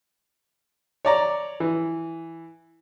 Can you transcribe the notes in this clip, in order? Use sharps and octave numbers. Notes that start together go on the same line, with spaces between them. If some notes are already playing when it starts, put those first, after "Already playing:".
C#5 D5 A#5
E3